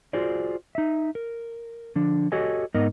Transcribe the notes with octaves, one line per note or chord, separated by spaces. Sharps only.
F4 F#4 G#4 C5 D5
D#4 E5
A#4
D3 F3 D4
F#4 G4 A4 C#5 D#5 G#5
G#2 B3 D#4 A#4 D#5